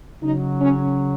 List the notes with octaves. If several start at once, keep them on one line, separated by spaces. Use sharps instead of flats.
C#3 F#3 D#4
C#4